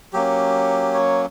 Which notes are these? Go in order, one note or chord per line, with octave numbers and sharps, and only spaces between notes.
F#3 A#3 C#4 G4
C#5